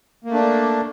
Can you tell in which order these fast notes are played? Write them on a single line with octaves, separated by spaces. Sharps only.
A#3 A3 D4